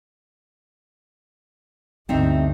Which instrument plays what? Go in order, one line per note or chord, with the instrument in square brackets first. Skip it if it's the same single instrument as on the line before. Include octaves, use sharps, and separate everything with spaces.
[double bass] G1 D2 [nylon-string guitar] C4 D#4 E5